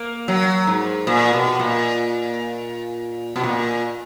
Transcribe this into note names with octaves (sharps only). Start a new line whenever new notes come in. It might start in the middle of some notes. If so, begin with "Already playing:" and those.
Already playing: A#3
F#3
G#2
A#2
B2
A#2
B2
A#2